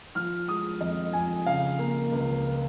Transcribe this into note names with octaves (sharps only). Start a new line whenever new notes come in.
F3 F6
G#3 D#6
F2 D#5
F2 G#5
C#3 F5
A#3
C#2